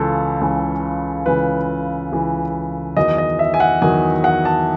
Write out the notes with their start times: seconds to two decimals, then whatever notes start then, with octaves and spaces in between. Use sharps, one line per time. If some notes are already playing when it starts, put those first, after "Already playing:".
Already playing: C#2 C#3 E3 A4
0.41 C#2 C#3 E3
1.26 C#2 C#3 E3 B4
2.12 C#2 C#3 E3
2.97 E2 D#3 F#3 D#5
3.18 D#5
3.39 E5
3.54 G#5
3.60 F#5
3.82 E2 D#3 F#3 G#5
4.24 F#5
4.45 A5